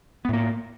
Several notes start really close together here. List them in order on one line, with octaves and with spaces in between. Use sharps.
B3 A2 A#3